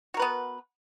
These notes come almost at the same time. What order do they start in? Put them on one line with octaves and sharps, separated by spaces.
F#4 A#4 B4 B3